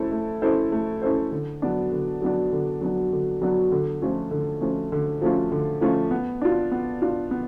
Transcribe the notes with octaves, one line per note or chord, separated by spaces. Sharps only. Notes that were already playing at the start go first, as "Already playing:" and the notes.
Already playing: A3 C#4 E4 A4 C5
A3
C#4 E4 A4 C5
A3
C#4 E4 A4 C5
D3
F#3 B3 D4
D3
F#3 B3 D4
D3
F#3 B3 D4
D3
F#3 B3 D4
D3
F3 A3 C#4 F4
D3
F3 A3 C#4 F4
D3
F3 A3 C#4 F4
D3
F3 A3 C#4 F4
B3
D4 F4
B3
D4 F4
B3